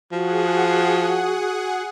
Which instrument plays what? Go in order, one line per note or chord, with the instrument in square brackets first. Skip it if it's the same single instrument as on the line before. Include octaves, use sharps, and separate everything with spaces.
[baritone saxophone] F3 [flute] F#4 [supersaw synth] G#4 F#5